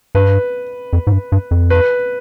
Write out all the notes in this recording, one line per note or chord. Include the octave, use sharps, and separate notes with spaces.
G2 B4
F2
G#2
G2
G2
F2
B4